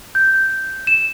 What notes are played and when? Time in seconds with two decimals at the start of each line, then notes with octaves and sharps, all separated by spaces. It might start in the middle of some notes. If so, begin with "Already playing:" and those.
0.15 G6
0.87 E7